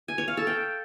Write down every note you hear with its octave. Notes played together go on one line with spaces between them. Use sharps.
G#5
C#5
F5
A4
G5